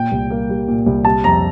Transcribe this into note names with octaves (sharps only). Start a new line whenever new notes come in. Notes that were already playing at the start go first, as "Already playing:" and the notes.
Already playing: A#2 G5
C2
A#3
G3
A#2
C2
C3 A5
F2 A#5